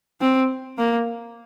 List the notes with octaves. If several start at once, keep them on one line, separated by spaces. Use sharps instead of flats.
C4
A#3